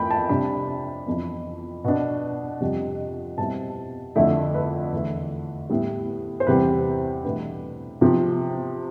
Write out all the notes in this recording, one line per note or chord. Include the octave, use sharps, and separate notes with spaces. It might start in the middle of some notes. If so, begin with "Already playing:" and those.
Already playing: F2 E3 A3 G5 B5
A5
C3 G3 D4 B5
F2 E3 B3
B2 B3 D4
F2 C3 G3
B2 G3 C4 E4 A5
F2 D3 A3 E4
B4
E2 D3 A3
A2 G3 B3 E4
C5
E2 C3 G3 C4 B4
E2 B2 A3 D4 B4
C3 F3 B3